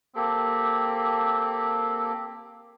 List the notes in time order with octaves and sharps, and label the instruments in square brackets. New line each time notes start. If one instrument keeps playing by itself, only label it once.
[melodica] A#3 G4 A4 [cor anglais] C4